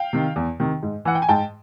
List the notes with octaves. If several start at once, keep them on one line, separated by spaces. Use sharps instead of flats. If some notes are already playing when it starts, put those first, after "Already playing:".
Already playing: F5 G5
C3 D#3
E2
C3 D#3
G#2
E3 F#5
G5
G#5
G#2 G5 A5